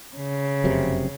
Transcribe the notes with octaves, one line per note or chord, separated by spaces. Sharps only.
C#3
F1 F#2 C3